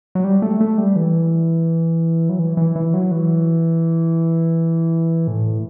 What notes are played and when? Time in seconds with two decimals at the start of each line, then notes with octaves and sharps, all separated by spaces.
0.15 F#3
0.24 G3
0.42 A3
0.61 A3
0.78 G3
0.96 E3
2.29 F#3
2.39 E3
2.57 E3
2.76 E3
2.94 F#3
3.11 E3
5.27 A2